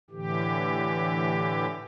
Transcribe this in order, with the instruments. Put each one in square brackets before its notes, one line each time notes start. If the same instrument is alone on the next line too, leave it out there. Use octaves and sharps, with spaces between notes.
[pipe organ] A2 D3 E3 G4